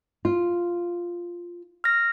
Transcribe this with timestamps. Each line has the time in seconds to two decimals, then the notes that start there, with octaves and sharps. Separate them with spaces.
0.25 F4
1.84 F6 A#6